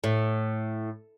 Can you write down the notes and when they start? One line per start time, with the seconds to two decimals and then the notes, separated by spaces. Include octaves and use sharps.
0.04 A2